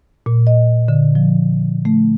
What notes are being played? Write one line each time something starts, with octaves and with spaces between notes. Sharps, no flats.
A#2
D#5
D3
F3
A3